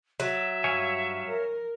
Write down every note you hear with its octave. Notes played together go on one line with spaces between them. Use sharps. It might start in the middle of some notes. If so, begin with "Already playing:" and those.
F#3 E5
G2 C#5 F5 G#5
A#4